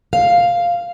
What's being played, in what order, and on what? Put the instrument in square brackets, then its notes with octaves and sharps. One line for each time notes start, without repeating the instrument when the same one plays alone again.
[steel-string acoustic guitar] F5